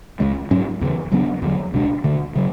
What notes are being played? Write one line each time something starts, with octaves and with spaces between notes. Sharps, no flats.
C#2 C#3 G#3
G#2 F#3 C#4
E2 C#3 E3
C#3 F#3 B3 D4
E2 D3 F#3
C#2 B2 G#3 D4
D2 D3 A3
C#3 F#3